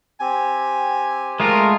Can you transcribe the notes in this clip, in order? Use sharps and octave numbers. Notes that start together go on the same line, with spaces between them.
C4 G4 G#5
G#3 A3 F4 A#4